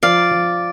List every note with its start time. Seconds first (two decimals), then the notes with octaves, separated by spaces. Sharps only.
0.03 F3 D5 F5
0.31 F3